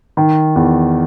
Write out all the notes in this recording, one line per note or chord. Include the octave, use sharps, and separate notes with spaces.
D#3
E2